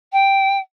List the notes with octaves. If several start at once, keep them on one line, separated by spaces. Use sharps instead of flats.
G5